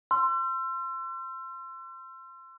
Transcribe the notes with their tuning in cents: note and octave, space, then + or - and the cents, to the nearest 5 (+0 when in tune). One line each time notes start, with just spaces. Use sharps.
C6 +0 E6 +40